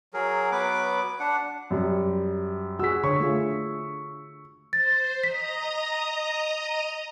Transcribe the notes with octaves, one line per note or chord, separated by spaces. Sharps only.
F#3 G#4 A#4
F#3 B3 B4 D6
D4 F#5
F#2 G3
F#4 G#4 E6 B6
D3 C#5 C#6
A3 F4 G#4
C5 A6
D#5 A#5 D#6 B6